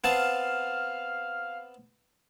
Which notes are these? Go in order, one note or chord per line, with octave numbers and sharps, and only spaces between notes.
B3 C4 F5 A5